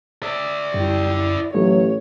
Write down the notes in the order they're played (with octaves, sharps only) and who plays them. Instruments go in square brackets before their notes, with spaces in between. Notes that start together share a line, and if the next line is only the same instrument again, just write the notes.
[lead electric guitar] D5 E5
[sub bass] F#2 [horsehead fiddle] G3 E4
[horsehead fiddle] E4
[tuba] A1 [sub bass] F#3 [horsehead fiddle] C#5